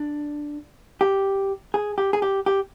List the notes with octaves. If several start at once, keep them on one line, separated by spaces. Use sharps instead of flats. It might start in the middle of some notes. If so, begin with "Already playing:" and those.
Already playing: D4
G4
G#4
G4
G#4
G4
G4